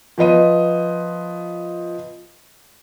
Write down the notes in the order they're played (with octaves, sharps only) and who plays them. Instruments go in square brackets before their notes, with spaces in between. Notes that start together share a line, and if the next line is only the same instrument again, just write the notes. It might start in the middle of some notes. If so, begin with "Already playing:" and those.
[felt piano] F3 B3 D#5 D#7